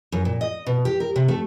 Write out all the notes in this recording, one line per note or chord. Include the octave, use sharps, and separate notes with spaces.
F#2
A#2
D#5
B2
G4
A#4
C3
A3